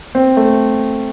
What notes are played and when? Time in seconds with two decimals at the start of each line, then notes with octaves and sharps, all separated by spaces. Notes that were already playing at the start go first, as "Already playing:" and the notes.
0.15 C4
0.37 A3